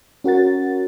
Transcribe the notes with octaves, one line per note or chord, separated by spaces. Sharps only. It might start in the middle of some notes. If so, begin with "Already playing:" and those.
C#4 F#4 A#4 F#5 A6